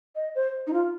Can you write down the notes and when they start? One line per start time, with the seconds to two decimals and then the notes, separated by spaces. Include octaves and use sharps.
0.15 D#5
0.35 C5
0.67 D#4
0.73 F4